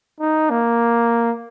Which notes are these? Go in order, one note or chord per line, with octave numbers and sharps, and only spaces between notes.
D#4
A#3